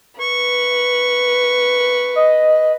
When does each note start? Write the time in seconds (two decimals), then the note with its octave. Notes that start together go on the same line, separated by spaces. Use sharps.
0.21 B4 C#6
2.16 D#5